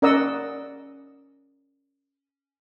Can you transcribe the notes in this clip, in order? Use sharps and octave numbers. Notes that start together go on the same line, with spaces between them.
C#4 A#4 D5 D#5 F#5 E6